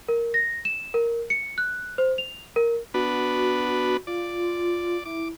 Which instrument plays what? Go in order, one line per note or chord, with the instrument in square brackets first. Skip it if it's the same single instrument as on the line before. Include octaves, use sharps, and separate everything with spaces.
[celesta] A#4
A#6
E7
A#4
C#7
F#6
C5
F7
A#4
[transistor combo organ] B3 D4 B4 [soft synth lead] F#4
[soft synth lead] F4 [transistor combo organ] D5
[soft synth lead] E4 [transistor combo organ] D6